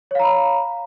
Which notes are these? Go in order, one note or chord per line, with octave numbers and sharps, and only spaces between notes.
C#5 F5 A#5 B5